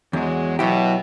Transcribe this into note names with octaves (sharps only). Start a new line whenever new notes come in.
E2 F#3 G#3
B2 F#3 E4 G4